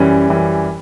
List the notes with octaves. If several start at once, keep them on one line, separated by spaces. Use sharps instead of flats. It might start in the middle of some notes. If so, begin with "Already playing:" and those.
Already playing: F#2 E3 G3 C#4 G4
F#2 E3 G3 C#4 G4